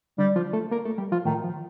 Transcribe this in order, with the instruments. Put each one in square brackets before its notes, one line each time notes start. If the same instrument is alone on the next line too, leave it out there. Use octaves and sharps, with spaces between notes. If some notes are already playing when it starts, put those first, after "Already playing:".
[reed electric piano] D3 D4 [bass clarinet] G3
[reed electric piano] F3 F4
A3 A4
A#3 A#4
A3 A4
G3 G4
F3 F4
[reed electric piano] A2 A3 [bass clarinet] D#3
[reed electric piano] F3